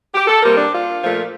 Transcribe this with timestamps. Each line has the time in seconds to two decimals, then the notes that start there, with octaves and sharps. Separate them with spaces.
0.14 G4
0.27 A4
0.42 C3 G3 A#3 A#4
0.58 D4
0.72 F4
1.02 A#2 F3 A3